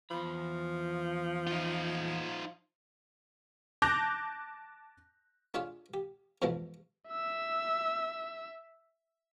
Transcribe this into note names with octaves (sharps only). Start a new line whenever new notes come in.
E2 F3 B5
D#4 F4
A5 D6 F#6 G6 A#6 F7
A3 D4 F4 G#4 C#5
G4
F2 G#2 B2 E3 F3 A3
E5 E6